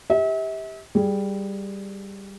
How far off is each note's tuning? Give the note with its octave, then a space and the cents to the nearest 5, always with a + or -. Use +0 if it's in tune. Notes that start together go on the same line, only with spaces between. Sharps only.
G4 +10 E5 -40
G3 +5 G#4 +0